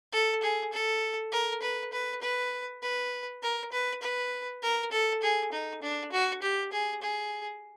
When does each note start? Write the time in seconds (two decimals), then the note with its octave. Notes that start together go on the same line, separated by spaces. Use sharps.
0.13 A4
0.42 G#4
0.73 A4
1.32 A#4
1.62 B4
1.93 B4
2.22 B4
2.82 B4
3.42 A#4
3.72 B4
4.02 B4
4.63 A#4
4.91 A4
5.22 G#4
5.52 D#4
5.82 D4
6.12 F#4
6.42 G4
6.72 G#4
7.02 G#4